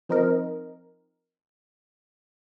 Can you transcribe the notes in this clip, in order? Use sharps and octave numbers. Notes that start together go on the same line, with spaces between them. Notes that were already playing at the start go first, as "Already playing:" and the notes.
F3 C4 D#4 A#4